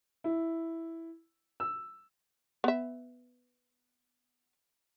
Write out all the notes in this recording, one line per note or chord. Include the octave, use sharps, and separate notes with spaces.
E4
E6
B3 E5